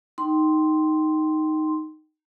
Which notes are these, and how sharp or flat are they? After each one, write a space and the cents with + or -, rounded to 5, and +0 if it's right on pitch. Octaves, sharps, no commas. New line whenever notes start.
D#4 +0 G5 -15 C6 +0